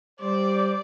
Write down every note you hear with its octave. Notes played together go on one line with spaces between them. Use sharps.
G3 C5 D5